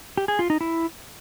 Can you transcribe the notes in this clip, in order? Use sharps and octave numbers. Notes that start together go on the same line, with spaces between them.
G4
G#4
F4
D#4
E4